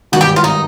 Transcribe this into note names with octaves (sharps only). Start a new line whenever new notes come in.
G#1 G2 D#3 F#4
G4
F4
D#4